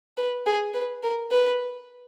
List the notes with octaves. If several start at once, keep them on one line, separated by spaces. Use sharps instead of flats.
B4
G#4
B4
A#4
B4